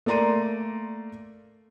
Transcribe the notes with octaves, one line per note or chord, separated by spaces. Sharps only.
A3 A#3 D5 A#5 C6 D#7